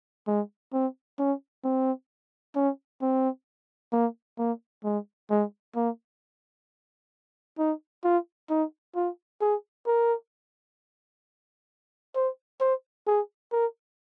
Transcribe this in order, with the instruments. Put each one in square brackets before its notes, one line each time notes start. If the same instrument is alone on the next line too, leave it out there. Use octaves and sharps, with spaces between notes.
[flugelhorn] G#3
C4
C#4
C4
C#4
C4
A#3
A#3
G#3
G#3
A#3
D#4
F4
D#4
F4
G#4
A#4
C5
C5
G#4
A#4